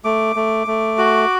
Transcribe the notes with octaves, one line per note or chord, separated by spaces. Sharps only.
A3 D6
A3
A3
F#4